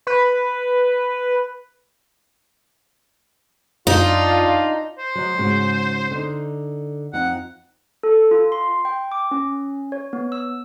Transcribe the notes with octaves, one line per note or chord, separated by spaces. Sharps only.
B4
F#2 D4 D#4 F4
C5
F#3 F#4 D#5
G#2 C#3 F#4
D3 D#4
F2 D#4 F#5
A4
F4
C6
G5
D6
C#4
C#5
B3
E6